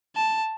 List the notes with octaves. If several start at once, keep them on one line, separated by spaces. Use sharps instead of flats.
A5